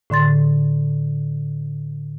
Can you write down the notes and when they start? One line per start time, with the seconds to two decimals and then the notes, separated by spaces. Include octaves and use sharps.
0.10 A2 D3 C6 A6